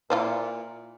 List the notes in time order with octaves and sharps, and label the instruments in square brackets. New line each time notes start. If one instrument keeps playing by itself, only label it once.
[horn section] A#2 [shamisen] E4 F4 C5